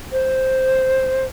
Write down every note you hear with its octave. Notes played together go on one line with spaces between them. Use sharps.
C5